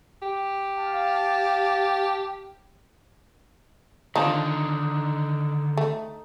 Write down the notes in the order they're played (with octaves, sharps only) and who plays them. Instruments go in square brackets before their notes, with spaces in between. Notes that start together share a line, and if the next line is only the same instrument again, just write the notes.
[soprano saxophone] G4
[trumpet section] F5 A5
[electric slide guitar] D3 D#3 [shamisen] F3 D4 [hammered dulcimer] D#4
[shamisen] A3